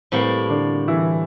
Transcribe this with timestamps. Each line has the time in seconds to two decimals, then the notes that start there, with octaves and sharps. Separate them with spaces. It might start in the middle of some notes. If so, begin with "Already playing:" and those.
0.12 A2 G3 A#3 C4
0.50 D3 D4
0.88 E3 E4